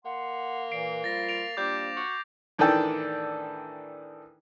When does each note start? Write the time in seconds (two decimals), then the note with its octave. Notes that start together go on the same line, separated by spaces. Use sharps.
0.05 A#3 F#5 C6
0.72 A#2 E3 C7 D7
1.04 F3 G3 F4 A6 A#6
1.29 D7 F7
1.57 F3 G3 A#3 D4 D6 G6
1.97 F#4
2.58 A2 D#3 E3 D4 A4 G5